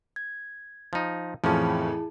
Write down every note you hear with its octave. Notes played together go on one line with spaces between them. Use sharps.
G#6
F3 D#4
F2 A2 E3 F3 C#4 E4 G#4 A5